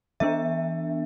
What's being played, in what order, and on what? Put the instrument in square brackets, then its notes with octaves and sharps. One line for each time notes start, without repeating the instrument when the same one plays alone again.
[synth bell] E3 B3 D4 E5